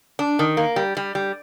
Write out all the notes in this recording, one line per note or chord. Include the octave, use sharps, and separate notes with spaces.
D4
D#3
A#3
G3
G3
G3